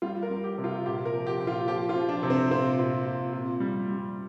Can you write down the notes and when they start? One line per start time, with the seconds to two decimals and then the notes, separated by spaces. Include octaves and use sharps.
0.02 G3 F4
0.23 A#4
0.30 G3
0.44 G4
0.58 C3
0.64 F4
0.85 A#2 G4
1.05 A#4
1.12 F3
1.27 G4
1.40 A#2
1.47 F4
1.68 F3 G4
1.89 F4
1.96 F3
2.09 D4
2.23 C3
2.30 C4
2.51 A#2 C4
2.78 A#2
3.06 A#2
3.33 A#2
3.60 G3
3.89 G3